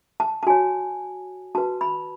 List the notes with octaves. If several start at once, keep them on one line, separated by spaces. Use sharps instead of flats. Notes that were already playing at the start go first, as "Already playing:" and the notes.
A5
A5
F#4 C#5 G#5
F#4 B4 A5
B5